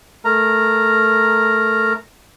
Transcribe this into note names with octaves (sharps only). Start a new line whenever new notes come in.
A3 A#4 A#5